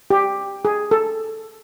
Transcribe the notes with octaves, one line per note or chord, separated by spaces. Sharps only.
G4
G#4
A4